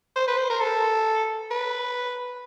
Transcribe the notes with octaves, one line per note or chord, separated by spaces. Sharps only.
C5
B4
C5
A#4
A4
B4